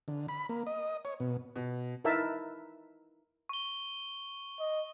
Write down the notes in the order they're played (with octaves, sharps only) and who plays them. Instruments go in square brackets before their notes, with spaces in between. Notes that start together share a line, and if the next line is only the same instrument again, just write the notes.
[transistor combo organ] D3
B5
A#3
D#5
C#5
B2
[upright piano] B2
[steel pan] D#4 E4 A#4 B4 E5 A5
[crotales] C#6 G7
[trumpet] D#5